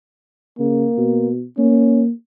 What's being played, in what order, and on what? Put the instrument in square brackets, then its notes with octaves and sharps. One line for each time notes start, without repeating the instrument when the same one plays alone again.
[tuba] C#3 [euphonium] A#3
[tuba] B2
[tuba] A#3 [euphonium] C#4